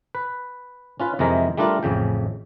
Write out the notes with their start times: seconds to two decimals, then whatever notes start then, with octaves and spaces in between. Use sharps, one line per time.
0.15 B4
1.00 C#4 F4 B4
1.19 F2 C3 E3 G#3 A#4 A#5
1.58 G3 A3 D4 F4 A#4
1.83 A1 F2 C#3 G5